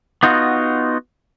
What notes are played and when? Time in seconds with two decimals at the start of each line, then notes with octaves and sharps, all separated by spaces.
0.23 B3 D#4 F4 F#4